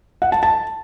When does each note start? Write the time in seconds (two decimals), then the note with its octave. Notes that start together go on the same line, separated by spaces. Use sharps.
0.22 F#5
0.32 A5
0.43 A5